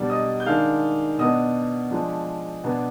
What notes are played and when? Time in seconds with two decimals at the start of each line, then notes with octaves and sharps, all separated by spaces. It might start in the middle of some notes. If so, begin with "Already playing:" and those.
Already playing: B2 G3 D4 D5
0.10 D#5 D#6
0.40 G6
0.46 D#3 G#3 D4 F5 F6
1.18 B2 B3 D4 D#5 D#6
1.91 F3 G#3 D4
2.63 B2 B3 D4